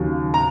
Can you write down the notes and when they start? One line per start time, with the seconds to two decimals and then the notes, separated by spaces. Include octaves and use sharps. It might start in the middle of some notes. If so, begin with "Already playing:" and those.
Already playing: D#2 C#3 F#3 C#4
0.34 A#5